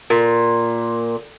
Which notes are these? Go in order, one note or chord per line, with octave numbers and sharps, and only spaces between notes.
A#2